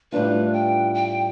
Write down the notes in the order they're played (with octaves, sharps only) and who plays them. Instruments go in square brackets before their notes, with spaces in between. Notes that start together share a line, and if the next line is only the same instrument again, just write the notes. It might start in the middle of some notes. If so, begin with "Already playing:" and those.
[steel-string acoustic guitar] A2 G3 D4 F4 [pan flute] B4
[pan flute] G5
G5